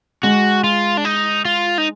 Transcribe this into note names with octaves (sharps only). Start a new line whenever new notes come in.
G#3 F#4
F4
D4
D#4
F4
D#4